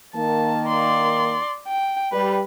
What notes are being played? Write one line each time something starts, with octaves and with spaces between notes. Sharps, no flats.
D#3 A#3 A5
D5 C6
G5
G3 B4